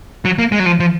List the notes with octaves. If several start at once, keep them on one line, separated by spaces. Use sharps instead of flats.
F#3
A#3
G#3
F#3
F3
F3